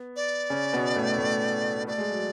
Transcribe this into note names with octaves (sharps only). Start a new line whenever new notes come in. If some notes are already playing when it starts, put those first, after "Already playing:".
Already playing: B3
D5
C#3 C#4
B2 B3
A2 A3
A2 A3
A3 D5
G#3
F#3